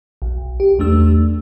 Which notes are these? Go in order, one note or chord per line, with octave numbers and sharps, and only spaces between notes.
B1
G4
E2 A3 D4 E6